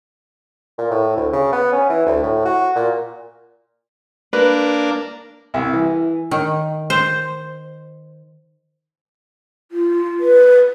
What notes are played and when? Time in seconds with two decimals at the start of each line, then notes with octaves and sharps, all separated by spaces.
0.78 A#2
0.91 A2
1.16 D2
1.33 C#3
1.52 B3
1.72 C#4
1.90 E3
2.06 D2
2.23 A2
2.45 F#4
2.76 A#2
4.33 A#3 D4 B4
5.54 C2
5.73 E3
6.31 D#3
6.90 C5
9.71 F4
10.20 B4